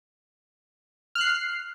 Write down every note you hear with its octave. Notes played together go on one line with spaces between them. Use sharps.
F6 F#6 C7